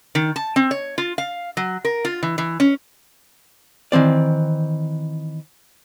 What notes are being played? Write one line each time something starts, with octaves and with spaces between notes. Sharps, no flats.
D#3
A5
C4
C#5
F4
F5
F#3
A#4
F4
E3
E3
C#4
D#3 E3 C4 D5